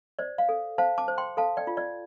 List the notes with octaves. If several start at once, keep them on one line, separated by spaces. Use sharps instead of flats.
C5 D5
F5
A4
C5 F5 A5
A5 D6
C5
G5 C6
A4 F5 A5
D5 G5
F4
D5